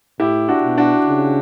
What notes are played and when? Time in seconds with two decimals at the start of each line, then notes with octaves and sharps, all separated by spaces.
0.19 A2 E4 G4
0.48 D4 F#4
0.63 B2
0.78 D4 F#4
1.06 C#3